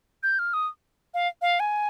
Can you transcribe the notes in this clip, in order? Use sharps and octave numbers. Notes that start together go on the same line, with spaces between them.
G6
F6
D#6
F5
F5
G#5